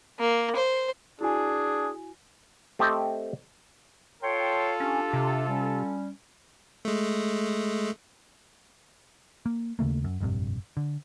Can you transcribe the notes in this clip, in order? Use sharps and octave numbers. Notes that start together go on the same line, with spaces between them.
A#3
C5
D4 E4 F#4 G#4 G#5
A3 C4 G4 A4 C5 D#5
F4 A4 C#5 G5 C6
C#4 D4 G4
C3
G3 C#4
G#3 A3
A#3
D#2 C#3 A3 A#3
F#2
F1 A#1 G2 C3
D3